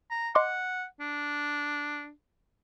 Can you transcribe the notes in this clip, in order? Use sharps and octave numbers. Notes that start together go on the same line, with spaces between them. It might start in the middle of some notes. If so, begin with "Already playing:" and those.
A#5
D#5 F#5 C6 D6
D4